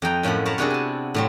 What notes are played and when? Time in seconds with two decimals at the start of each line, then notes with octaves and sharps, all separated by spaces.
0.02 F2 D#5 G5 A#5
0.23 F#2 A2 F3 F#5 B5
0.45 A#4 B4 C#5 F#5 A5 A#5
0.58 C3 B3 D4 E4 F#4 G#4
0.70 G#5 A5
1.15 A2 F#3 C4